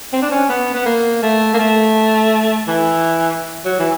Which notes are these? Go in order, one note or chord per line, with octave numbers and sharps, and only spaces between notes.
C4
D4
C#4
B3
B3
A#3
A3
A#3
A3
E3
F#3
E3